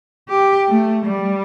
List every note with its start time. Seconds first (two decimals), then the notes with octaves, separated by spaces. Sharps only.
0.29 G4
0.68 A3
1.06 G3